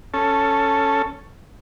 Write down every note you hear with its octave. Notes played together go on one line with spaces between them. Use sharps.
C#4 A4